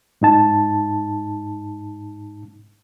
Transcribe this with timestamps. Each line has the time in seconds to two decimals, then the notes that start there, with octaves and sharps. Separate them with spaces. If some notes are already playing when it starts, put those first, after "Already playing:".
0.21 G#2 D#4 A5